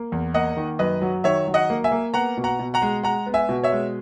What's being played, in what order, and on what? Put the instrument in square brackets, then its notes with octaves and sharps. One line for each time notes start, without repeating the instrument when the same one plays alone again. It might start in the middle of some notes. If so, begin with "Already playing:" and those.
Already playing: [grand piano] A#3
E2
A#3 D#5 F#5
D#3
F#2 B4 D#5
F#3
D#3 C#5 E5
F#3
D#5 F#5
A#3
E5 G#5
A#3
B3 F#5 A#5
B2
F#5 A#5
B2
F#5 A#5
G#3
G#3 F#5 A#5
B3
E5 G#5
B2
C#5 E5
G#3